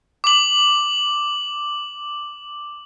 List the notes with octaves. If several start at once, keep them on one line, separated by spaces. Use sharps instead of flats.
D6 F#7